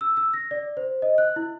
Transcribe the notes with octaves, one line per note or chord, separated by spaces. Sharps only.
E6
E6
A#6
D5
C5
D#5
F#6
E4